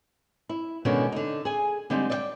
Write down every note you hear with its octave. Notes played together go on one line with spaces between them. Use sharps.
E4
B2 D3 D#3 G#3 C#4 F#4
D3 D#4
G#4 G#5
D3 G3 G#3 C4 D#4
D5 D#5 G5